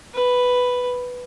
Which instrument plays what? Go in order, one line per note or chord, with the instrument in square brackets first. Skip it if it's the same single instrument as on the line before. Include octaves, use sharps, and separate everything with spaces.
[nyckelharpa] B4